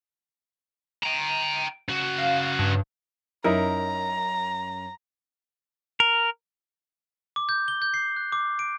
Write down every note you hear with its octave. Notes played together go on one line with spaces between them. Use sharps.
G5 A#5
C#3 F#4
F5
G2
F#2 C#4 D#4 E4 A#4 A#5
A#4
D6
G6
G7
G6
C7
F#6
D6
D7